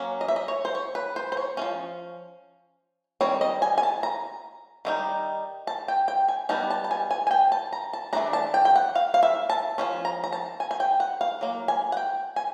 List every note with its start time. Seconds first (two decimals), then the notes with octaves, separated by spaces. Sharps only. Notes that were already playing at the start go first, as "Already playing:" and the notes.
Already playing: F#3 A#3 C#4
0.21 D#5
0.28 E5
0.36 D#5
0.48 C#5
0.65 C5
0.75 C#5
0.95 B4
1.16 C5
1.32 C5
1.37 C#5
1.57 A3 C#4
1.62 F3
3.21 D#3 G3 C4 C#5
3.41 D#5
3.62 G#5
3.78 G#5
3.83 A5
4.03 A#5
4.85 D#3 G3 C4 D#4
5.67 A5
5.88 G5
6.08 G5
6.28 G#5
6.49 G3 B3 D#4 A5
6.70 A5
6.84 A5
6.91 G#5
7.11 G#5
7.27 G#5
7.31 G5
7.52 A5
7.73 A#5
7.93 A5
8.13 E3 A3 D4 A#5
8.33 A5
8.54 G5
8.65 G5
8.76 F#5
8.95 F5
9.14 F5
9.23 E5
9.50 A5
9.78 F3 G#3 C#4
10.05 A#5
10.24 A#5
10.32 A5
10.60 G#5
10.71 G#5
10.80 G5
11.00 F#5
11.21 F5
11.41 F#3 A#3
11.68 G#5
11.92 F#5
11.97 G5
12.36 G#5